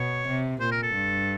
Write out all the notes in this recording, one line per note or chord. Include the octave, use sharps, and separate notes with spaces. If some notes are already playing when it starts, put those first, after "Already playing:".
Already playing: B2 C#5
C3
A#2 C5
A#4
A4
G2